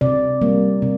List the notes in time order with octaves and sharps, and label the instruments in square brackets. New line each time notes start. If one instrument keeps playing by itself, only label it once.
[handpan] C3 D5
G3 A#3
C3